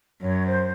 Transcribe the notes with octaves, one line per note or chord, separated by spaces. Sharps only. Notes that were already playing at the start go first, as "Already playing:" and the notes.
F#2 C#5
C5